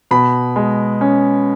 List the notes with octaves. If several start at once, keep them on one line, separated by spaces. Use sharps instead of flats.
B2 B5
G#3
C#4